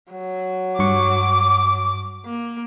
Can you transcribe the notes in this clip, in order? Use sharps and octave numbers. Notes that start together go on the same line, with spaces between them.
F#3
G2 C#6 D6
A#3